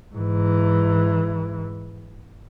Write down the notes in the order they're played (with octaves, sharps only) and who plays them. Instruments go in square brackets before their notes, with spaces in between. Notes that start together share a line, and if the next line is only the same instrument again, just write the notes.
[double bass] G#2 E3